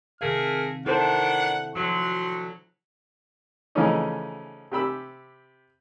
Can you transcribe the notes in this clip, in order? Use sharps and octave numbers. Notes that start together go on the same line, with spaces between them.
C3 D#3 A3 G#4 A#4 F5 F6
D#3 D4 E4 A4 C5 F#5 A5
D2 F3 F#3 C6
C#3 E3 F3 A3 C#4 D#4
C3 G4 B5 E6